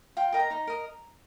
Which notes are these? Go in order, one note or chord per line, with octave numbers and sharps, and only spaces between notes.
F4 G5
A#4 D#5 G5
A#5
D#4 A#5
A#4 D#5